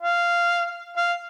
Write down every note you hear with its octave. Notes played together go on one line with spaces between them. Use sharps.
F5
F5